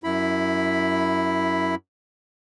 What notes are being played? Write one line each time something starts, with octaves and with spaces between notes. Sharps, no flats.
F#2 E4 B5